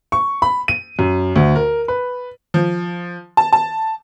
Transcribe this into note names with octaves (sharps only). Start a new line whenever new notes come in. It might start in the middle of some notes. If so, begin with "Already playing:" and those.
C#6
B5
D#7
F#2
D2
A#4
B4
F3
A5
A5